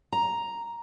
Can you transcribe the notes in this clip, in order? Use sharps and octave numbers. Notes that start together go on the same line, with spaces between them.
A#5